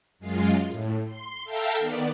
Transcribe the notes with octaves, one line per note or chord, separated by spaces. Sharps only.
F#2 G#3 F4 C7
A2
C6
A4 E5 F5 G5 A5 A#5
D#3 B3 D5